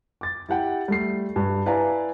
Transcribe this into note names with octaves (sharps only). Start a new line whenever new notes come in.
D6 A6
E4 G4 F#5 G5
G3 A3 C7
G2
E4 B4 D5 F5 G#5 A#5